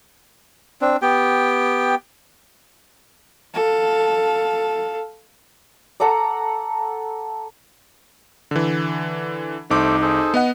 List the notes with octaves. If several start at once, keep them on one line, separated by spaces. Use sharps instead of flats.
C4 D4
B3 G4 G5
A4 F5
A4 F#5 A#5 D6
D3 E3
C2 A3 D#4 A4 C5 D6
G#4 A4 C5
B3 D#5 F#5